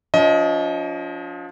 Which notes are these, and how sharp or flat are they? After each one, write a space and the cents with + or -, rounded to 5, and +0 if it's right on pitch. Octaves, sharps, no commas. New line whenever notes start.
F3 +25 D4 -45 D#5 +25